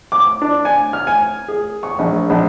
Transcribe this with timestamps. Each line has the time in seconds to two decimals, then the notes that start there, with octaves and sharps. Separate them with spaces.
0.12 D6
0.42 D4
0.65 G#5
0.93 F6
1.07 G#5
1.48 G#4
1.83 C#6
1.99 A#1
2.30 A#1